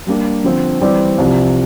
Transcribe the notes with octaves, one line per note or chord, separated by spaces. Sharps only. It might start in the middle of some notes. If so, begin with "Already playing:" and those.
G3 A#3 D4 G4
D3 F3 C4
E3 G3 C4 G4 D5
C2 C3 F3